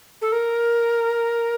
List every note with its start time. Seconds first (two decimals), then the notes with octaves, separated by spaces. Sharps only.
0.22 A4
0.32 A#4